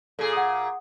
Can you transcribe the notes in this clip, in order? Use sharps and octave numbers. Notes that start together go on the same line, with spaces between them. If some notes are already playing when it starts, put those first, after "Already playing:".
A#2 G#4 A4
F#5 D#6